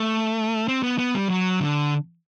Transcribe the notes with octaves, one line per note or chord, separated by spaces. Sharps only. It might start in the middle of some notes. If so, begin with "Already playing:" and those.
Already playing: A3
C4
B3
B3
G3
F#3
D3